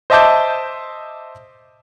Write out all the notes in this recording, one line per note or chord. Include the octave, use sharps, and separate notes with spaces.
C5 D#5 E5 A5 D6 G6